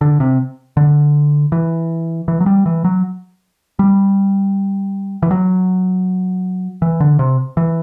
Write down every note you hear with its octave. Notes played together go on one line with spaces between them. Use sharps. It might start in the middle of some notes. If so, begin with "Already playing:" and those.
D3
C3
D3
E3
E3
F#3
G3
E3
F#3
G3
E3
F#3
E3
D3
C3
E3